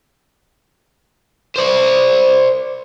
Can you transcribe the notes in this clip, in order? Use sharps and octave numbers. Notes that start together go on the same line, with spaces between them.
C5 D5